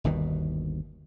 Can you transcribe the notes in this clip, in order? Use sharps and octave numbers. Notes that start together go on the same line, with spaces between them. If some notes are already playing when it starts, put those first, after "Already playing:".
G1 D#2 B2 D#3